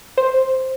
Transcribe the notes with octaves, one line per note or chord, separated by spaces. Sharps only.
C5